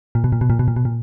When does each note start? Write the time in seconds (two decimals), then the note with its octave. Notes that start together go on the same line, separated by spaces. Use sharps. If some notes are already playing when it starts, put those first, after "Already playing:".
0.15 A#2
0.24 B2
0.32 A#2
0.41 B2
0.50 A#2
0.59 B2
0.68 A#2
0.76 B2
0.85 A#2